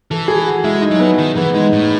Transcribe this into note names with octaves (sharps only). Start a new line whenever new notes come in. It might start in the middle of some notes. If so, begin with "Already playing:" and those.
E3 A4
G#4
F#4
G#3 E4
D#4
F#3
B3
D#3
E3 B3
G#3 D#4
A2